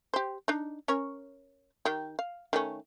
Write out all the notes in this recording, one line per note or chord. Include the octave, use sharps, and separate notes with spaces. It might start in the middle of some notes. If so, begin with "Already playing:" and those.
G4 C5
D4 D#4
C#4 A#4 C#5
D#3 G4
F5
D#3 A3 C#4